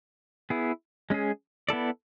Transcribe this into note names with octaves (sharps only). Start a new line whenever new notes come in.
B3 E4 G#4
G#3 C#4 G#4
B3 E4 A4 D5